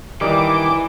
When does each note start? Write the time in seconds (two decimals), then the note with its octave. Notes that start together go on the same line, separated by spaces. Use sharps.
0.21 D#3 E3 G3 D6